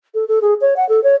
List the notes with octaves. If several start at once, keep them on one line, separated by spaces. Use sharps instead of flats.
A4
A4
G#4
C#5
F#5
A4
C#5